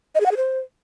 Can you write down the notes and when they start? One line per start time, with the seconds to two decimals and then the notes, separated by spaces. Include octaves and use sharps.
0.15 D#5
0.20 G#4
0.26 F#5
0.31 G#4
0.37 C5